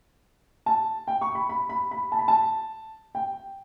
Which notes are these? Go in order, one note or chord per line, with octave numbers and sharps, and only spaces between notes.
A5
G5
C#6
B5
B5
B5
B5
A5
B5
A5
G5